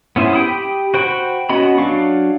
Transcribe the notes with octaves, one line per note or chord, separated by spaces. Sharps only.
B3 C#4 E4 C5
G4 G5 B5 D#6
F#4 C5 G5 B5 C#6
B3 C#4 F#4 D#5 B5
F#3 D4 F5 C#6